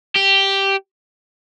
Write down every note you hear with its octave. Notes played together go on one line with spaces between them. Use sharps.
G4